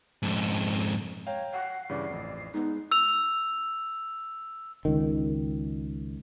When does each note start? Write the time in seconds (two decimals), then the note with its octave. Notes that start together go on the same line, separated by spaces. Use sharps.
0.23 F2 G#2
1.27 C#5 F5 G5 A#5
1.53 F#5 C7
1.89 G2 C#3 E3 D5
2.10 A1 F2
2.54 G#3 B3 D#4
2.92 E6 F7
4.85 C#2 D#3